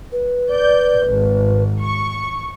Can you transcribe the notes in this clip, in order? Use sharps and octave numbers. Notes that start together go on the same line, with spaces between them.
B4
D5 G6
G#1
C#6